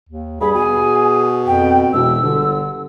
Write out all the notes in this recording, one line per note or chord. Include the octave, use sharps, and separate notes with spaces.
D#2
G2 G#4 B5
B2 G#5
F2 G5
E1 B2 E6
G1 D3